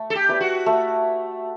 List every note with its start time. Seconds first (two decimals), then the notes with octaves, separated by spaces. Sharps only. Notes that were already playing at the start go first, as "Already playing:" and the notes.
Already playing: A3
0.10 A4
0.15 G4
0.29 E4 B4 D5
0.41 F#4
0.66 A3